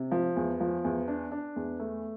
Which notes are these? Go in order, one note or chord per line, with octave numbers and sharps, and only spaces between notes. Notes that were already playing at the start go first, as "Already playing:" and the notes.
Already playing: C3
F3
E2
F3
E2
D4
D4
E2
A3